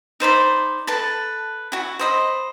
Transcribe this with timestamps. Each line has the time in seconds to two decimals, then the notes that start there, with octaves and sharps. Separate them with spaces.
0.20 D#4 C5 D5 B5
0.87 A4 B4 A5
1.72 E4 F#4
1.99 C5 D#5 B5